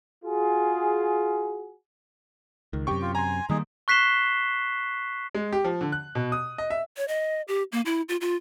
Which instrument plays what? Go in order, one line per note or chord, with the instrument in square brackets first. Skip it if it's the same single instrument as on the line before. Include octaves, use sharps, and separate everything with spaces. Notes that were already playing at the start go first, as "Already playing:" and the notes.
[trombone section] F4 F#4 G#4
[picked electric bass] C#2 [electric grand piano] D#3
[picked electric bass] F#2 C3 [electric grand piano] G4 G5 C#6
[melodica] F4
[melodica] G#5 [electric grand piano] A#5 C6
[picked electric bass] D#3 G3 A#3 [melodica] D#4 G#4
[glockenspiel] C#6 F#6 B6 C7 E7 G7
[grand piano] G#3
G4
F3
D3
F#6
B2
D#6
D#5
E5
[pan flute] C#5
D#5
G4
A#3
E4
F4
F4